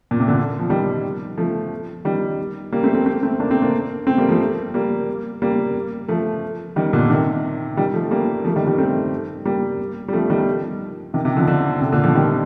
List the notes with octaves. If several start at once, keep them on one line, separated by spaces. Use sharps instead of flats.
A#2
C3
A#2 D3
F3
D#3 G3
F3 A3
D#3 G3
G3 A#3
A3 C4
A3 C4
A3 C4
A3 C4
A#3 D4
A3 C4
A#3 D4
A3 C4
G3 A#3
F3 A3
G3 A#3
G3 A#3
F3 A3
D#3 G3
A#2 D3
C3 D#3
D#3 G3
F3 A3
G3 A#3
F3 A3
D#3 G3
D#3 G3
A3 C4
G3 A#3
G3
F3 A3
D#3 G3
C3 D#3
C3 D#3
D3 F3
D3 F3
C3
A#2 D3
D3 F3
D#3 G3